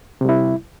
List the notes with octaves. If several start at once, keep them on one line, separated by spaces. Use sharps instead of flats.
C3 G3 E4